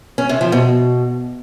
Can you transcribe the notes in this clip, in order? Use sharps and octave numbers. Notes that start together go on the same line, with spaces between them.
C#4
C3
F3
B2